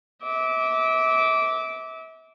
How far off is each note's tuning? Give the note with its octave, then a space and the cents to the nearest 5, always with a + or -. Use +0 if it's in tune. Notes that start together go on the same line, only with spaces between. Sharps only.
E5 -35 D6 -15